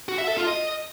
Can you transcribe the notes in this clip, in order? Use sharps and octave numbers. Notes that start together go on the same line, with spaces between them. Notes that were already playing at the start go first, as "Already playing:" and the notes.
F#4
E5
A4
F4
D#5